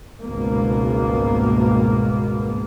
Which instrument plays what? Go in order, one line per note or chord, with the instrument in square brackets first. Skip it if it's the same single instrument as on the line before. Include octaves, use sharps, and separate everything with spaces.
[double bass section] G#1 C#2 G2 B2 A#3